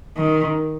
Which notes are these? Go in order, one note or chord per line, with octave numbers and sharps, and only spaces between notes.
D#3